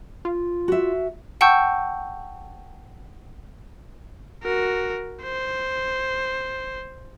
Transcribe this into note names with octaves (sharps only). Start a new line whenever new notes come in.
F4
F#4 E5
F#5 G5 A5 C#6 E6 G6
F#4 A#4
C5